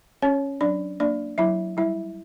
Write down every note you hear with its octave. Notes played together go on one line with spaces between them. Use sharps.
C#4 C#5
F#3 D4 D5
A#3 D4 D5
F#3 E4 E5
G3 E4 E5